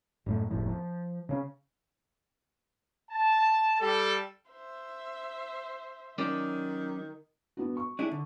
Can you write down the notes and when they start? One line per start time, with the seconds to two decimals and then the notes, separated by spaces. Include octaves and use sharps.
0.26 F#2 A2 A3
0.50 F#1 E2 A2 F3
0.69 F3
1.29 C#3 C#4
3.10 A5
3.81 G3 A4
4.51 C5 E5
6.18 D#3 F#3 C#4 D5
7.57 B3 D4 F#4
7.77 C#6
7.99 D4 E4 G#4
8.11 D3